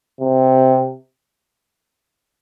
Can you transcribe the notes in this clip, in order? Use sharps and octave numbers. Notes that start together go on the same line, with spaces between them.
C3